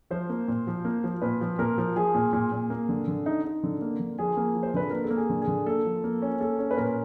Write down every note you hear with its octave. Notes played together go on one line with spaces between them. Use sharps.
F3 C5
A#3
A#2
F3
A#3
F3
A#2 B4
F3
A#2 A#4
F3
F3 G#4
A#2
A#2
A#2
A#3
D3
D3
D#4
D#4
D3
A#3
D3
F3 G#4
A#3
F3
C5
D3 B4
A#3 A#4
A4
A#3
G#4
D3
G#4
D3
A#3 A4
F3
A#3
C#4
A#3 A4
C#4
B4
A#2 A#4